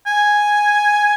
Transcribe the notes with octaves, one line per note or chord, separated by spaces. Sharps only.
G#5